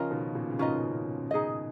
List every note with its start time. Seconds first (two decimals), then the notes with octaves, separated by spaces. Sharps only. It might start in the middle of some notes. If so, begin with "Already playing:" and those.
Already playing: C#3 F3 C#4 F4 A#4 D#5
0.11 B2 D#3
0.35 A#2 C#3
0.50 C#3
0.59 G#2 B2 C#4 F4 A#4 D#5
1.31 D#4 G#4 D#5